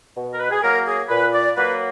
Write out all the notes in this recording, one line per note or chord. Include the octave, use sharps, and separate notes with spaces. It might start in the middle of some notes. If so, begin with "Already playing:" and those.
B2
A#4
B4
G#4
F#3 A#3 A#4
G#4
A#2 B4
D5
F#3 A#3 B4